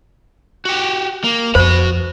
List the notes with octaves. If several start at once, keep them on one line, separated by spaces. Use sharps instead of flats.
F#4 G4
A#3
F2 F#4 C5 B5